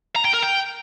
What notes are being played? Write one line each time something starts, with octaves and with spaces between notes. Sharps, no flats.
A#5
G5
A#4
G5